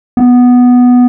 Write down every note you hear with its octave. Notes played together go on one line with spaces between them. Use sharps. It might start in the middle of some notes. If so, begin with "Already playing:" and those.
B3